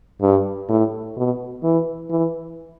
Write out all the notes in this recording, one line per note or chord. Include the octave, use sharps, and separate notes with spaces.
G2
A2
B2
E3
E3